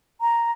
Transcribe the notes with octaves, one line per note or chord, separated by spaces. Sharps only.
A#5